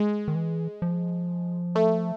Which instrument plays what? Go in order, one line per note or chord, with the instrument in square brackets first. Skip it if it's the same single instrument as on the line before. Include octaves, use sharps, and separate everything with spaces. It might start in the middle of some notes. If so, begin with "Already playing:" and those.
Already playing: [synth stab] G#3
[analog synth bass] D#3
E3
F3
[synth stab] A3